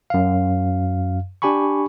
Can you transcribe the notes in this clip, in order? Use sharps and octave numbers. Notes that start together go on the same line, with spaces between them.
F#2 F5
D4 G4 G#5 B5 C#6